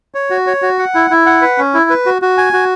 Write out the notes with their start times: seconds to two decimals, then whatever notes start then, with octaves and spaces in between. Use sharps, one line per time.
0.15 C#5
0.30 F#4
0.47 C#5
0.62 F#4
0.79 F#5
0.95 E4
1.10 E4
1.26 F#5
1.42 B4
1.58 C#4
1.74 E4
1.90 B4
2.06 F#4
2.22 F#4
2.38 G#5
2.53 F#4